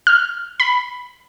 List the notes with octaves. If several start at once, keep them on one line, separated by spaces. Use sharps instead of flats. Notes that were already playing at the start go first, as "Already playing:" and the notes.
F6
B5